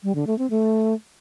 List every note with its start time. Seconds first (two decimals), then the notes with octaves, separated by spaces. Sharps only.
0.03 G3
0.15 D3
0.27 A3
0.39 C4
0.50 A3